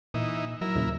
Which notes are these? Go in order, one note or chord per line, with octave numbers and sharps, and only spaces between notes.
A#2 E3 D#4
F#3 E4 A#4
D#2 A#2 C#3